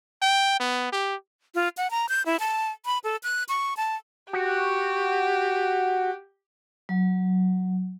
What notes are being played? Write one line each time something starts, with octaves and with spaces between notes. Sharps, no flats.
G5
B3
G4
F4
F#5
A#5
G6
E4
A5
B5
A4
F#6
C#6
A5
F#4 G4
F#3